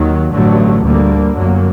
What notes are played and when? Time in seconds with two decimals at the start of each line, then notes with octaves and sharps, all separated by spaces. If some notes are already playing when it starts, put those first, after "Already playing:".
Already playing: D#2 D#3 F#3
0.32 A1 G2 D3 F#3 A3
0.84 D2 D3 G3 A#3
1.36 G1 F#2 F#3 A#3